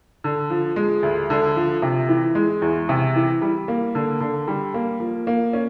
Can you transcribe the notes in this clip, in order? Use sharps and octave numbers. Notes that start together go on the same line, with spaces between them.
D3
F3
G#3
D2
D3
F3
C3
E3
G#3
E2
C3
E3
G3
A#3
D3
D3
G3
A#3
F3
A#3
C#4